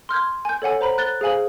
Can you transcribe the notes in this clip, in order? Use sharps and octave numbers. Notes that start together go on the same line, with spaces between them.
C6 F6 G6 G#6
G#5 G6
A4 C#5 F#5 G#5
C5 A#5 B5
F#6 A6 G7
G#4 C5 F5 G#5 F#7